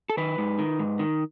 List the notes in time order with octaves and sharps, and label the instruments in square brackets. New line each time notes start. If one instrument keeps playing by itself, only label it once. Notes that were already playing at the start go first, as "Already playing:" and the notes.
[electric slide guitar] A4
D#3 B4
G#2
D#3
G#2
D#3